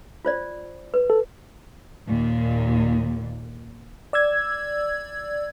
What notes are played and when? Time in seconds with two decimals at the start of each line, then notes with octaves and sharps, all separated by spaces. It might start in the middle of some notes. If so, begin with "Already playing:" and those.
0.25 F4 C5 D5
0.94 B4
1.10 A4
2.09 D#2 A#2
4.13 D5 E6 G#6